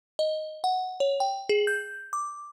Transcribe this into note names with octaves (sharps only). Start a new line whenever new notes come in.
D#5
F#5
C#5
G5
G#4
G6
D6